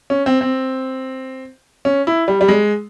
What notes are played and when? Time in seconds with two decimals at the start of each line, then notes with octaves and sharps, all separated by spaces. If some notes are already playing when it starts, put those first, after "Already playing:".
0.10 C#4
0.26 C4
0.41 C4
1.85 C#4
2.07 E4
2.28 G3
2.41 G3
2.48 G#3